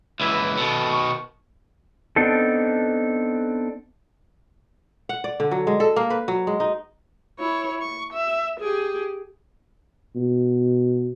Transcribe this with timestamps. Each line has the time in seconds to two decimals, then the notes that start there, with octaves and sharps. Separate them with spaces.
0.20 C#2 E3 E4
0.57 B2 D#3 A4
0.90 C#6
2.16 B3 C4 D4 D#4 A4
5.09 F#5
5.24 D5
5.40 D3
5.51 F#3
5.67 G#3
5.80 A4
5.96 A#3
6.10 B4
6.28 F#3
6.47 G#3
6.60 D#4
7.39 E4 C#5
7.81 C#6
8.13 E5
8.60 G4 G#4
10.16 B2